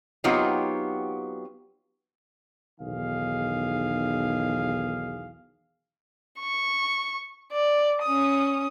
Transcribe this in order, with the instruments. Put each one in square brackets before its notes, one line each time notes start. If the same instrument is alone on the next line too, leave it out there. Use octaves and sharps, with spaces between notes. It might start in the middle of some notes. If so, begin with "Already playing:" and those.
[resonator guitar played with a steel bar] F#3 B3 C4 D#4 F4 G4
[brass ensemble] B1 E2 D#3 G#4 F5
[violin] C#6
D5
C#4 D#6